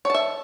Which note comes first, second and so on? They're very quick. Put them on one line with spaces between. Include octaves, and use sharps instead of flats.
C#5 A5 E5